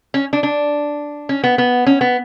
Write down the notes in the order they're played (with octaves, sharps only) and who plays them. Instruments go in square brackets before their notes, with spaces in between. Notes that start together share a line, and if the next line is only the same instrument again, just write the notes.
[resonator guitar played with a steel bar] C#4
D4
D4
C#4
B3
B3
C#4
B3